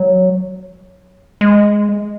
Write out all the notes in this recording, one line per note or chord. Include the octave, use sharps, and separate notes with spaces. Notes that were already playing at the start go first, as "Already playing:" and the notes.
Already playing: F#3
G#3